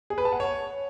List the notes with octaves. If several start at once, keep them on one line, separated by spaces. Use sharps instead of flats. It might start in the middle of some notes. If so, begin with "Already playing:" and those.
G#4
B4
A5
F#5
C#5